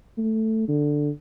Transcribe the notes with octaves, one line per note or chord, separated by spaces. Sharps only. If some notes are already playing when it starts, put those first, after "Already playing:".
A3
D3